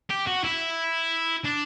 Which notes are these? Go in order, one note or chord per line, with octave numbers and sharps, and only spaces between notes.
G4
F#4
E4
D4